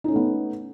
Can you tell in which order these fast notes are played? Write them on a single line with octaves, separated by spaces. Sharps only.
D#4 C#4 A3 B3